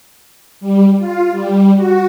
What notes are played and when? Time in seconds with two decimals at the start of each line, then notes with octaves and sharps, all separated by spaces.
0.61 G3
0.98 F4
1.31 G3
1.76 F#4